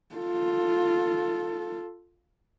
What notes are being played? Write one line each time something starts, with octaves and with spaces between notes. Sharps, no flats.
F4 A4